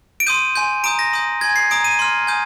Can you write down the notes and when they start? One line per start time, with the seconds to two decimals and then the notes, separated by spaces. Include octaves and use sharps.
0.20 D7
0.26 C6 D#6 G6 D#7
0.55 G#5 C6 G6
0.84 A#5 D#6 G6 D7
0.99 A#6
1.13 C6 D#6 G6
1.41 G#5 C6 G6 G#6
1.56 C7
1.70 A#5 D#6 G6 D7
1.84 D#7
1.99 C6 F6
2.27 G#5 D#6 G6